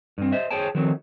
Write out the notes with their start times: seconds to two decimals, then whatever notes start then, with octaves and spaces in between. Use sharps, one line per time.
0.18 G2 C4
0.32 C5 D#5 E5
0.50 G#4 C5 C#5 G5 A5
0.75 D#3 F3 F#3 A3 C4